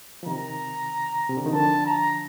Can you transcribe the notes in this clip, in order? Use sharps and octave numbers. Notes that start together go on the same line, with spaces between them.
F3
C3 D#3 A#5
C3
D3
D#3
D3 F3 A5
A#5